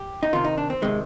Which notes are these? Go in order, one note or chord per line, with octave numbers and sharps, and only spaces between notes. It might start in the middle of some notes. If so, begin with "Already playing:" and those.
Already playing: G4
D#4
C3 D#3 F4
D#4
D4
C4
C3 D#3 G#3